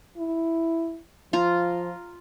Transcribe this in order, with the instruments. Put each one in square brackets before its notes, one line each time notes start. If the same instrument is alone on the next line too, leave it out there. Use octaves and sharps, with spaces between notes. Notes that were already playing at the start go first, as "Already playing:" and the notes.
[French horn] E4
[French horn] F3 [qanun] F4 A#5